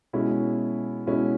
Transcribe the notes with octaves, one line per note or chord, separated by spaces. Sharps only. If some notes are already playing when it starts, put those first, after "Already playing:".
B2 G#3 C#4 E4
B2 G#3 C#4 E4